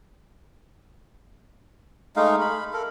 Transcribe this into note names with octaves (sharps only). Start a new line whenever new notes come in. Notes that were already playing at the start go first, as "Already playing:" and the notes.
G#3 A3 D#4 F5
B5
A4 A#4